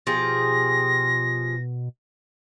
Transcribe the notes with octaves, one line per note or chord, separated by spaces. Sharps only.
B2 F3 G4 G#4 A#6